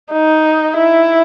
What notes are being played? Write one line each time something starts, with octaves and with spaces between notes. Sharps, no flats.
D#4
E4